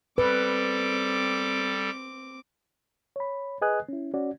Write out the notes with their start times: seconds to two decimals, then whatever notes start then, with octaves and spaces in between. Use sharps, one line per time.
0.18 G3 C4 A4 B4 D6
3.16 C#5 B5
3.62 G#4 B4 D#5 G#5 D#6 F#6
3.89 C#4 E4
4.14 C#4 F#4 D5